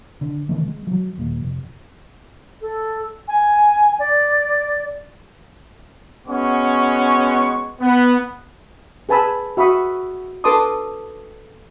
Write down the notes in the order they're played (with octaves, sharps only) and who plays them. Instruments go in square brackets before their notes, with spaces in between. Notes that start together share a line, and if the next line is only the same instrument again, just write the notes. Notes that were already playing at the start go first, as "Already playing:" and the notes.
[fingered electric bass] D3
C2 D#3 E3 A3
G#3
F3 F#3
D#2 A#2
F1
[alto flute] A4
G#5
D5
[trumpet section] G#3 B3 C#4 F#4 C#6
B3
[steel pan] G#4 B4 G#5 A5 B5 E6
F#4 E5 B5 C#6 D#6
A4 B4 A5 C6 D6 D#6